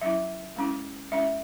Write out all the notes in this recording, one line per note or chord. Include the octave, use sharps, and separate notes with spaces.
F#3 C#4 E4 E5
G#3 C#4 E4
G#3 C#4 E4 E5